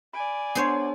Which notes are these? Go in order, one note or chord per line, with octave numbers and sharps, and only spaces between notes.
D5 G#5 B5 D7
B3 D4 G#4 C5 C#5 F#5